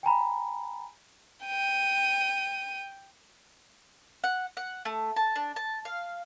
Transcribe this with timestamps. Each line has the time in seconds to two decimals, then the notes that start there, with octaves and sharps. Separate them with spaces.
0.03 G5 G#5 A#5 B5
1.46 G5 D#7
4.24 F#5
4.57 F#5
4.85 A3
5.17 A5
5.36 D4
5.56 A5
5.85 F5